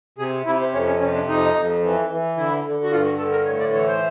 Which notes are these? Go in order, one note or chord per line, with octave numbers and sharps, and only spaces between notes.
C3 G#4
C3 E4
C4
F2 C#4
C#4
C3 C#4
D4
F2 D#4
F2
E3
E3
D3 E4
D3
F#4
G2 F4
F#4
D3 A4
A#4
A2 C#5
D5
E3 C#5
C5